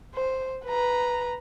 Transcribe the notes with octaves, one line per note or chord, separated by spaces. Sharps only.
C5
B4 A#5